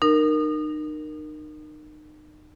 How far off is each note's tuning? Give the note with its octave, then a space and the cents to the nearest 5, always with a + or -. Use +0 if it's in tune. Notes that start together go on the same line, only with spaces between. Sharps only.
D#4 -35 A#4 +0